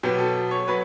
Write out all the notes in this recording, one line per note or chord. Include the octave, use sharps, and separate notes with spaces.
B2 F#3 B3 G4
A4
C#5
F#3 B3 B4